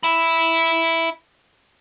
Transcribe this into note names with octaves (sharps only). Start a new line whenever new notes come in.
E5 B5